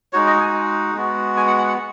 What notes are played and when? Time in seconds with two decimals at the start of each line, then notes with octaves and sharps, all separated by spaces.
0.13 G#3 D#4 F#4 C#5
0.27 D#5
0.40 G#5
0.95 G#3 B3 F#4
1.37 G#5
1.47 F#5
1.58 F#5
1.68 F#5